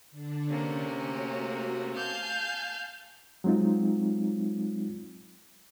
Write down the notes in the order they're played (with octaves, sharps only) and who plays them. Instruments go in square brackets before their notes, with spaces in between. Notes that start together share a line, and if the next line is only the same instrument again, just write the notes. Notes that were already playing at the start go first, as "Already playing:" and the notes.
[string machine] D3 D4
[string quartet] C3 A#3 C#4
[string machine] A3 F#4
[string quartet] F5 A5 G6 [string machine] G#5
[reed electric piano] F#3 G#3 C4 D#4 F4